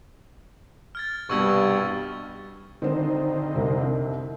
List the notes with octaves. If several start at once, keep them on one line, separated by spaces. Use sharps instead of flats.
F6 G#6 A6
C2 G2 B2 G3 C#6 E6 G#6
D3 D#3 C4 D#4 C5
C2 C3